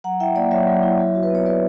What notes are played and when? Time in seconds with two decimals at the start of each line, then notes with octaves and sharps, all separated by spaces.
0.04 F#3 F#5 A#5
0.20 E4 E5 G5
0.35 A#3 D5 F#5
0.51 F#3 C#5 E5
0.67 F#3
0.83 E4
0.99 F#3
1.15 F#4
1.23 B4
1.30 B3 C#5
1.46 F#3 B4 D5